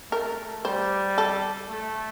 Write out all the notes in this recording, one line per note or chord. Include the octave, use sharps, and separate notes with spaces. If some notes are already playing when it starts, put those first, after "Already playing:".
A3 A#4
G3 C5
A4
A3